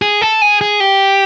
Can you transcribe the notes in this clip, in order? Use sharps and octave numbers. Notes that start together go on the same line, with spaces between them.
G#4
A4
G#4
G#4
G4